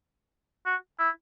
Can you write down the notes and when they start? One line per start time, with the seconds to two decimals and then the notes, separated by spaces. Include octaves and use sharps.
0.66 F#4
0.99 E4